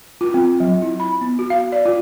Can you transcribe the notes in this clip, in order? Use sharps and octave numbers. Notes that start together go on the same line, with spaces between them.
F4
C4
F#3
E4
B5
B3
F#4
F5
D5
F4